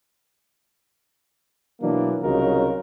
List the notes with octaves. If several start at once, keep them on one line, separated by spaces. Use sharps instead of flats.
B2 E3 F#3 A#3 D4
C2 C#3 F#3 D#4 F4 A#4